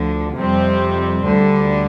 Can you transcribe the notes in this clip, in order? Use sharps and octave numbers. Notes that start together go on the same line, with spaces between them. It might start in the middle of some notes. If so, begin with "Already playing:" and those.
Already playing: D2 D3 F3
F2 C3 G3 C4
D2 D3 G3